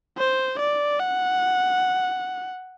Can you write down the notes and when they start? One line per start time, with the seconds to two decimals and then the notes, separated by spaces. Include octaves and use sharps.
0.18 C5
0.60 D5
1.00 F#5